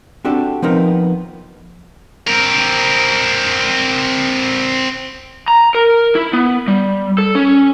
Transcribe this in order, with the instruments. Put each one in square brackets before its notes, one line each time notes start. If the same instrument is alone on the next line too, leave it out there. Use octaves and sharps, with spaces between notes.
[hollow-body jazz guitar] C4 D4 F#4 G4 A4
F3 B3 C4 D#4 A#4
[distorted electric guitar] C4 A#4
[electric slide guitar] A#5
A#4
E4
B3
G3
A4
C#4